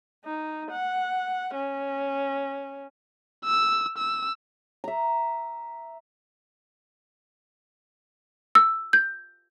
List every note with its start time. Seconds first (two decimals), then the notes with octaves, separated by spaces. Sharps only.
0.25 D#4
0.71 F#5
1.54 C#4
3.45 E6
3.98 E6
4.84 E5 A#5
8.55 E6
8.93 G6